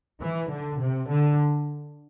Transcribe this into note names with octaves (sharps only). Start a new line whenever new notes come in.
E3
D3
C3
D3